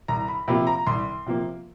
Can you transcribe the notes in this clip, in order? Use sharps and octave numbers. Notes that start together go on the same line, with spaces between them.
C2 A#5
B5
C3 F3 A#3 B5
A#5
C2 C6
C3 F3 A#3